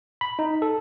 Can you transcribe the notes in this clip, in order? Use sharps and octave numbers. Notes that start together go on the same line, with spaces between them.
B5
D#4
A4